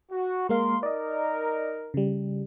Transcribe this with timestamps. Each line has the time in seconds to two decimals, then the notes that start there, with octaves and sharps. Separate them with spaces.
0.11 F#4
0.49 G#3 A#3 A#4 F5 C6
0.83 D#4 A#4 D5 D#5
1.94 C#3 G3